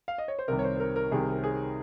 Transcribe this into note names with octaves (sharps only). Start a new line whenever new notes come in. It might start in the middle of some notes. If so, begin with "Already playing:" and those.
F5
D#5
C#5
C5
C2 C3 D#3 G3 A#4
C#5
C5
C5
A#4
A#4
C2 C3 D#3 G3 G#4
G#4